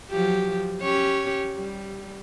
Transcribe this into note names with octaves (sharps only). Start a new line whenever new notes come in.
F3 F#3 G4
C#4 G4 C#5
G3